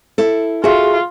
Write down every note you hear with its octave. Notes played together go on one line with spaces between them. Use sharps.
E4 A4
F4 F#4 G#4 E5